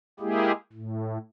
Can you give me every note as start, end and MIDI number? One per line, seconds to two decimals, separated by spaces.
0.20 0.52 56
0.20 0.52 58
0.20 0.52 64
0.20 0.52 67
0.20 0.52 68
0.73 1.18 45